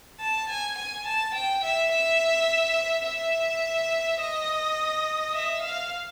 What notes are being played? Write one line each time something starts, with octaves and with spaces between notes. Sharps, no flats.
A5
G#5
G#5
A5
G5
E5
E5
E5
D#5
E5
F5